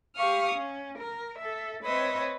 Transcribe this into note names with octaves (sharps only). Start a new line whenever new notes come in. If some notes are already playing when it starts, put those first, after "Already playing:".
G4 F5 C#6 D#6 F6
C#4
A#4
A4 E5
C4 B4 C#5 D#5 E5